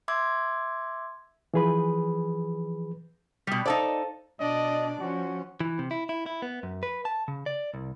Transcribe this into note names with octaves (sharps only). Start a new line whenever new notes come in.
E5 C6 D6 E6 G#6
E3 F3 G#4 B4 B5
B2 G3 D#6 B6
D#4 A4 C5 D5 F5 A5
B2 D4 D5 D#5
F3 C#4 F#4
E3
C3
E4
E4
E4
B3
F#2
B4
A5
C#3
D5
C2